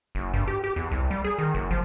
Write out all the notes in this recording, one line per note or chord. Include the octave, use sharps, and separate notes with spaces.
F#1
G2
G4
G4
E2
C2
G3
G#4
D#3
F#1
F3